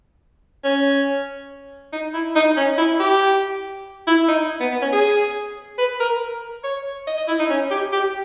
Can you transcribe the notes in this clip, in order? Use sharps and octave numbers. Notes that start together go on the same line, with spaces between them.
C#4
D#4
E4
D#4
C#4
E4
G4
E4
D#4
B3
B3
C#4
G#4
B4
A#4
C#5
D#5
D#5
E4
D#4
C#4
G4
G4